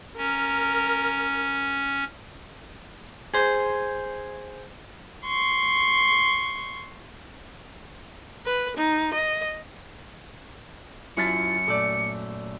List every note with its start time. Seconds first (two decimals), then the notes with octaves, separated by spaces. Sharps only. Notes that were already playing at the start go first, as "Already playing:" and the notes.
0.17 C#4 A#4
3.34 G#4 C5
5.26 C6 C#6
8.46 B4
8.77 D#4
9.14 D#5
11.17 F#2 E4 F4 A5 C#7
11.67 A#2 A3 A4 D5